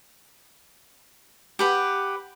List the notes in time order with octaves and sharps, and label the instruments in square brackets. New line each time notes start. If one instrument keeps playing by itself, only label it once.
[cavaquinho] G4 B4 F#5